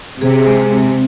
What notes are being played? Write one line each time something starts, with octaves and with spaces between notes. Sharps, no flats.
C3 G#4
G#3
C4